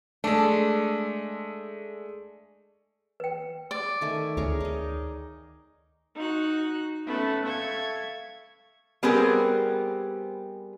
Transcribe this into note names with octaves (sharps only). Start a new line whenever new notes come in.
G#3 A3 D4
B4 G5
D5
D#3 A3 G#5
D2 G#4 A#4 C#5
D#4 D#5
D#4 F#4 F#6
A3 B3 C#4 A4 B4
A4 E5 F5 C#6 G#6
G3 B3 C4 G4 G#4 A#4